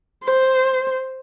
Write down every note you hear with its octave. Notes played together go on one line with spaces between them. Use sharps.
C5